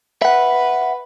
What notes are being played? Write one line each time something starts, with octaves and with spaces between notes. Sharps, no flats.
B4 E5 F#5